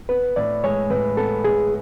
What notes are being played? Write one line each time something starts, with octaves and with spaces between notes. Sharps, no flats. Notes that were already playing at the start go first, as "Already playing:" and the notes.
B3 B4
A2 D5
G#3 C#5
A2 B4
B3 A4
A2 G#4